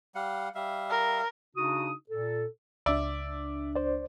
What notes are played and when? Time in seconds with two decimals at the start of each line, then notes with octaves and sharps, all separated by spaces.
0.15 G3 F5 F#5
0.55 G3 E5 F5
0.90 A#4
1.56 C#3 D4 D#4 F#4 D#6
2.10 A#2 A4
2.86 C#2 D4 D5 E5
3.76 C5 D5